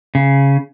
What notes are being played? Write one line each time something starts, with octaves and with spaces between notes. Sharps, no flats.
C#3